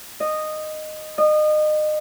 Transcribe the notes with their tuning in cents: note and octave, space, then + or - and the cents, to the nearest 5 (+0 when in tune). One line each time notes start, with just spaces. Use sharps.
D#5 -10
D#5 -30